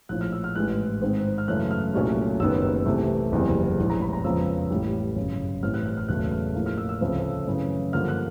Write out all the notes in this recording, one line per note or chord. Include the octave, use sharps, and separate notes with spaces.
A#1 A2 F3 F#6
F6
E6
F6
A1 G#2 E3 G#3 F#6
G#2 D#3 G#3 C4
F6
F#2 C#3 E3 A3 F#6
F6
C2 A#2 F#3 A3 C#4
F#1 F#2 D#3 G3 B3 E6
C2 C3 E3 A3
F#1 E2 C3 E3 G3
A#1 A2 E3 G#3
A#5
B5
A#5
F2 C#3 F3 G#3 B3 E6
A1 A2 E3 G3
G1 F#2 C#3
A1 A2 E3 G3 C4 F6
F#6
F#6
F6
E1 E2 C#3 F#3 A3 F#6
F6
A1 A2 F3 A#3
F6
E6
E6
D2 C#3 F3 A3 C4
F#2 C#3 E3
G2 D3 F3 A#3 F6
F#6